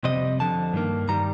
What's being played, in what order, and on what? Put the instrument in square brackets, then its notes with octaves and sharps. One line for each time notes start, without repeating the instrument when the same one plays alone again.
[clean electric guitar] F2 C3 G3 C4 D#5
F2 D3 F3 A5
G2 D#3 A#3
G2 D#3 G3 A#5